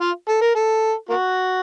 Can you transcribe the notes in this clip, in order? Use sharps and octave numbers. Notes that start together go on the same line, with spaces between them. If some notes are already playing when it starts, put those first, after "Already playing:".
F4
A4
A#4
A4
A#3 F#4